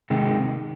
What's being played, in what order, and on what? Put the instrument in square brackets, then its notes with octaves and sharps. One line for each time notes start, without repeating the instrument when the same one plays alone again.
[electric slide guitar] C3 D#3 G#3